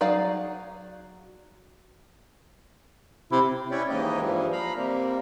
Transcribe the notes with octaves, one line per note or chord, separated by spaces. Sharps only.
F#3 D#4 G#4 D5 F5
C3 E4
C#4 E4 B4 C#5 D5 G5
D#2 G#2 E3 A#3 G4 D#5
G2 E3 F3 G3
F5 A#5 B5
C3 G3 A#3